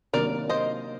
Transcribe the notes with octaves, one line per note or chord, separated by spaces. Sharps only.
C3 D#3 F#3 A#3 D4 A#4 D5
C5 D#5